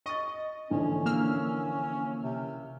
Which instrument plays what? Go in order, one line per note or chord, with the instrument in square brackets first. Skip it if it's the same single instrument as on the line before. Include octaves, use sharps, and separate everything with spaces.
[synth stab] D#5 [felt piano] C#6 A6
[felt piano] A#1 D3 E3 [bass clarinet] C#4
[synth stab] A#3 E6 F6
[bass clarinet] C3